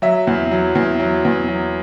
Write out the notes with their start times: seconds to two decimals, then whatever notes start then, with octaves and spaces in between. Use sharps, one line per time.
0.02 F#3 E5
0.27 E2
0.51 F#3
0.75 E2
1.00 F#3
1.25 E2
1.48 F#3